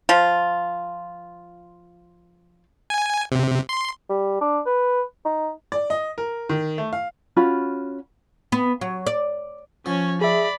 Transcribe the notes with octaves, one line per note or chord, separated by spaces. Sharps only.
F3 F4
G#5
C3
C6
G3
D4
B4
D#4
D5
D#5
A#4
D#3
A3
F5
C#4 F4 F#4 B5
B3
F#3
D5
F3 C#4 C#5
G#4 D5 E5 B5